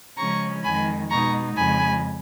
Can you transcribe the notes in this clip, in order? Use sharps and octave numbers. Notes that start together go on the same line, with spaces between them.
C#3 F3 G#3 C#4 A#5 C#6
F2 D#3 G#3 G#5 B5
B2 G#3 D#4 A#5 C#6
F2 C#3 G#3 G#5 B5